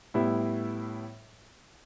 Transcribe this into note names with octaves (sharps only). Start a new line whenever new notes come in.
A2 G3 B3 E4